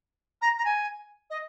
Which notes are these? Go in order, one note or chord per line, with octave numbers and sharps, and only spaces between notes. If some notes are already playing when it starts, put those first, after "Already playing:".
A#5
A#5
G#5
D#5